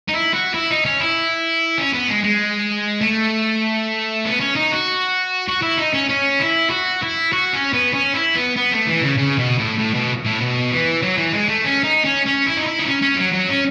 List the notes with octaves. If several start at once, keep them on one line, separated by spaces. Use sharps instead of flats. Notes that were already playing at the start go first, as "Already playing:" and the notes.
D#4
E4
F#4
E4
D#4
C#4
E4
C#4
B3
G#3
G#3
A3
B3
C#4
D#4
F#4
F#4
E4
D#4
C#4
C#4
E4
F#4
E4
F#4
C#4
B3
C#4
E4
B3
B3
A3
E3
C#3
C#3
B2
A2
A2
B2
A2
B2
E3
F#3
E3
G#3
A3
C#4
D#4
C#4
C#4
E4
D#4
E4
D#4
C#4
C#4
F#3
F#3
C#4